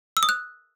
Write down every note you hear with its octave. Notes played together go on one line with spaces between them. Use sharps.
E6
D#6
F#6